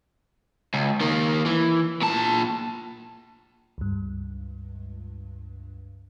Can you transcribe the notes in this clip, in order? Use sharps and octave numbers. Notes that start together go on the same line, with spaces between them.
C#2
D#3 A#3
E3
A#2 A5
C#2 G2